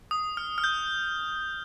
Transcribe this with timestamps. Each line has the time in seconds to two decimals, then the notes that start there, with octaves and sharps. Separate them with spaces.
0.11 D#6
0.37 F6
0.58 F6
0.64 G6